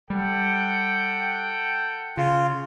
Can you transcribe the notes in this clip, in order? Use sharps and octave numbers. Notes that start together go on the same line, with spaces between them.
G3 A4 F#5 G5
C#3 F4